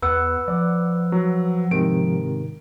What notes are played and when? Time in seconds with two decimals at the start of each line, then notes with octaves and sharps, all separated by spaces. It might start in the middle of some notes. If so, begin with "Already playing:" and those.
0.02 E2 B4 F#5 E6
0.48 F3 D5
1.12 F#3
1.71 G#2 C3 D#3 D7